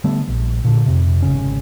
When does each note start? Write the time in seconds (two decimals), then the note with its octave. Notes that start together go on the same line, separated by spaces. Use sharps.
0.04 D3 G3 A3 B3
0.29 A#1
0.64 A#2 D3
0.86 F2 C3
1.22 G#1 C#3 C#4